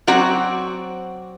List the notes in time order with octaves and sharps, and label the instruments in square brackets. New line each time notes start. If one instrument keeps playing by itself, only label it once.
[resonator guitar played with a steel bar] F#3 C4 F#4 D5